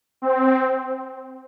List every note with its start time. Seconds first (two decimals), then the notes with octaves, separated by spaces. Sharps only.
0.22 C4